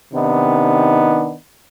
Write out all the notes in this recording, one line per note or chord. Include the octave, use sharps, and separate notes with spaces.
C3 D#3 B3 D4 D#4